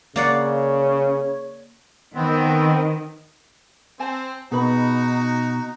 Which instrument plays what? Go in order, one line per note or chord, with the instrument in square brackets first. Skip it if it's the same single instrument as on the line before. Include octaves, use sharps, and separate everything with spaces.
[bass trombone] C#3 [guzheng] A#3 D5 F#5 [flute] C#5
[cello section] D#3 [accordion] B3 C4
[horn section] C4 [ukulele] C5 G#5 A5
[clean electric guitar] B2 [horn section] D#4 F#4 [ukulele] G#4 B4 B5